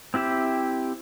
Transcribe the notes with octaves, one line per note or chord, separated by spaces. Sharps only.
C4 E4 G4 E5